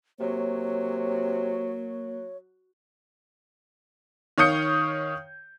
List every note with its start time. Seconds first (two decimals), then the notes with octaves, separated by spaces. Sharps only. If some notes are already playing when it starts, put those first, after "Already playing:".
0.20 C3 F#3 A#3 C#5
4.38 D#3 C#5 F5 D#6 G6 C#7